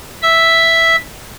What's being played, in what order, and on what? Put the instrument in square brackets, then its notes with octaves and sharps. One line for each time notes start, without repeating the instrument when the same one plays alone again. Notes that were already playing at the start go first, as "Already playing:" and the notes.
[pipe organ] E5 E6